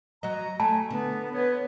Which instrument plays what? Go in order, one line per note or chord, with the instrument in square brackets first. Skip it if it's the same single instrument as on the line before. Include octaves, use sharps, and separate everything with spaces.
[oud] F#3 F#4 D#5 [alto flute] A#5
[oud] A3 [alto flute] G#5 [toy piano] A5
[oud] D3 [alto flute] B3
[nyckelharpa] B3 B4 [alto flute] C#5